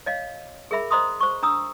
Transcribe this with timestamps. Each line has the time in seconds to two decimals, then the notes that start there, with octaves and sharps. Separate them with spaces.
0.06 C#5 D#5 F5
0.71 G#4 A#4 E5 B5
0.91 C5 D#5 A#5 C6 D#6
1.20 C5 C#6
1.43 D4 A#5 D#6 E6